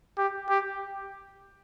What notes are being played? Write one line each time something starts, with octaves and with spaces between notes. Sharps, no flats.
G4
G4